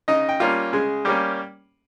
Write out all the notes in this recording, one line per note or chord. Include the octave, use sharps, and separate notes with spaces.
C#3 D#4 D#5
G5
G3 A#3 C#4 F4 F5
C#3 G#3 G#4
G3 A#3 C#4 G4